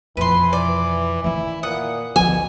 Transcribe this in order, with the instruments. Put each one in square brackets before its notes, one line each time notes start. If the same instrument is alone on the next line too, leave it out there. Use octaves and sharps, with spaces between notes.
[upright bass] F2 B2 [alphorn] E3 [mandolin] B4 C6
[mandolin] D5
[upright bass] D#3 E3 [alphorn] E4
[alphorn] A#2 [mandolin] F#5 D#6
[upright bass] D2 F3 [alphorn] B2 [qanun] G#5